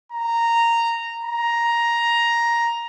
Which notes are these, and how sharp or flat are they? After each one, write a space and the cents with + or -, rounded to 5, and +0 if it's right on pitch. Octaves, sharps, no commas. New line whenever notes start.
A#5 -10
A#5 +10